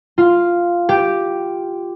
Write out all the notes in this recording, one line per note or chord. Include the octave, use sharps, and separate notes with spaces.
F4
G4